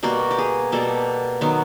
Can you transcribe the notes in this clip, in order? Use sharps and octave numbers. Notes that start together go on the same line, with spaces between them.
B2 G3 A#3 F#4
G4
G#4
B2 G3 A#3 A4
D#3 F#3 B3